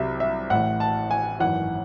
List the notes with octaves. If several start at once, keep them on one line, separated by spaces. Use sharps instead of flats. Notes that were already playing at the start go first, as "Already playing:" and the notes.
Already playing: C2 C3 F#3 E5
E5
A1 A2 E3 F#5
A5
G#5
G#1 F#2 E3 F#5